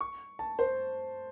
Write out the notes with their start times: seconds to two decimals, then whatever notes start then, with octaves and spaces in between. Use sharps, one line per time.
0.01 C#6
0.39 A5
0.59 C5